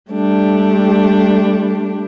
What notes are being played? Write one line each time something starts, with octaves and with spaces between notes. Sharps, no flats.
G3 A3 D4 G4